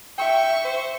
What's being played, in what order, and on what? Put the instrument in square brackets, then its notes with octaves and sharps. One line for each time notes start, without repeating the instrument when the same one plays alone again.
[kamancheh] E5 C#6 [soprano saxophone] G5
[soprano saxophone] C5